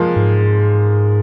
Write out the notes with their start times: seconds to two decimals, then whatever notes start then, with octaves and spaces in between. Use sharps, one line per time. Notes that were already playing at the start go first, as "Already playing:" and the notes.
Already playing: F3 G#3 A#3
0.16 G#2